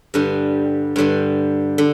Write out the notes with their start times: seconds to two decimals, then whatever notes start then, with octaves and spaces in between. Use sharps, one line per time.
0.14 G2 D3 G3
0.96 G2 D3 G3
1.78 D3